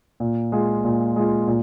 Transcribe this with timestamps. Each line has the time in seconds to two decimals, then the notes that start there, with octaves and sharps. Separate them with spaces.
0.20 A#2
0.52 G#3 F4
0.84 A#2
1.16 G#3 F4
1.47 A#2